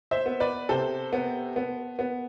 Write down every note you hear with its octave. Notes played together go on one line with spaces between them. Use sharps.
C5 E5
B3
B4 D5
C3 A4 C5
B3
B3
B3